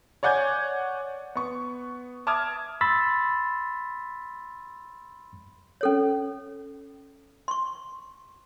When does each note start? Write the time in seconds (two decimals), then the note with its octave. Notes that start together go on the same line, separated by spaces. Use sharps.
0.23 C#5 D5 F#5 G#5 G6 G#6
1.35 B3 C#6
2.27 E5 A5 D6 D#6 F6 G#6
2.81 B5 C6 E6 A6 B6
5.81 C#4 A4 C#5
7.48 C6 C#6